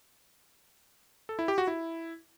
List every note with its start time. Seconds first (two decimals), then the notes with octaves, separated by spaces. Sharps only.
1.29 A4
1.39 E4
1.48 G4
1.58 F#4
1.67 E4